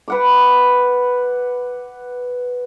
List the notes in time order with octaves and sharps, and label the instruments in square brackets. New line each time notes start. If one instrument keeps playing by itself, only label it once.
[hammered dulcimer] B4 F#5 D6